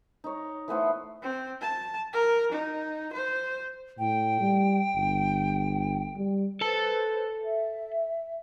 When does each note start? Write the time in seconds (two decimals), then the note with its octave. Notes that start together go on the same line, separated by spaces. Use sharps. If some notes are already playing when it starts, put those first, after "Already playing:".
0.24 D#4 C#5
0.68 E3 A3 B3 C5
1.23 C4
1.62 A5
2.13 A#4
2.52 D#4
3.13 C5
3.99 A2 G5
4.40 G3
4.95 G1
6.16 G3
6.61 A4 B4 C5 A5
7.41 E5